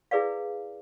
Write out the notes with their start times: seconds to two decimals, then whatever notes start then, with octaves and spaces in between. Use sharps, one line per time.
0.11 E4 G#4 B4 D5 F5